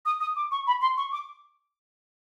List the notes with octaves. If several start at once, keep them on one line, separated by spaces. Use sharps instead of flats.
D#6
D#6
D6
C#6
B5
C6
C#6
D6